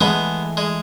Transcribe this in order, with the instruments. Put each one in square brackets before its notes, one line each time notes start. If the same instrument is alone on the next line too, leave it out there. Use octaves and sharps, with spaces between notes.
[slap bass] E3 A3 [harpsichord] G#3 B3
[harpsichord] G#3